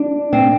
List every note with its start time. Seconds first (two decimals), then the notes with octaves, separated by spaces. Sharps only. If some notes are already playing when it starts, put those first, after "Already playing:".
Already playing: D4
0.33 C4